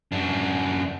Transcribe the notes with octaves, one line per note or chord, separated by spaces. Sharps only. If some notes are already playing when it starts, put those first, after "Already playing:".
F#2 D4